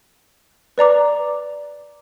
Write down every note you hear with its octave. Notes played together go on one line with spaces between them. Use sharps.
B4 D5 A#5 D6